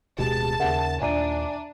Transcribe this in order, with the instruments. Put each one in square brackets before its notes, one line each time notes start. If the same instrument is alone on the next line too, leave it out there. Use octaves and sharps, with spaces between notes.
[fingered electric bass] D1 B2 G#3 [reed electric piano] G4 G#4 [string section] A5
[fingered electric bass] D#2 C#3 [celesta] A#4 E5 F#5
[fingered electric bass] D#2 A#2 [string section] D4 [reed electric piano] D5 G#5 [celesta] E5 A#5 D#7